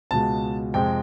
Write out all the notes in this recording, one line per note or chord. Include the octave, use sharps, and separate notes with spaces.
C#2 B2 G#3 A5
F2 C3 F3 G#3 G5